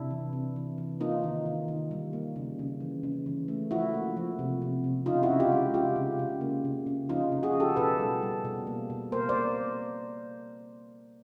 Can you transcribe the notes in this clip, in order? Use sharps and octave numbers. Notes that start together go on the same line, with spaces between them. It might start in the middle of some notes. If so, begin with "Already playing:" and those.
Already playing: C3 D4 E4
E3
C3
E3
E3
A#3 D#4 F4
D#3
D#3
D#3
G3
A#3
C#3
C#3
E3
C#3
E3
A3
F3 E4 F#4
A#3
F3
C3
C3
C3
C#3 D#4 F4
E4 F#4
C#3
F4 G4
G#3
C#3 F4 G4
C#3
C#3
A#3
C#3
C#3
F3 D#4 F4
C#3
F#4 G#4
C#3
G4 A4
B2 A4 B4
G3
G3
B2
A#3
B2
A#3 A#4 C5
C5 D5
A#3